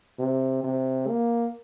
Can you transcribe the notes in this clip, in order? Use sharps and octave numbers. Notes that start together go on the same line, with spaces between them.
C3
C3
A#3